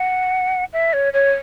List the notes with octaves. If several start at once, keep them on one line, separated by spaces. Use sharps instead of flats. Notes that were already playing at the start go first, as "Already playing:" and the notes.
Already playing: F#5
E5
C#5
C#5